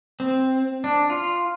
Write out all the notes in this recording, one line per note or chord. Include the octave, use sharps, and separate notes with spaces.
C4
D4
F4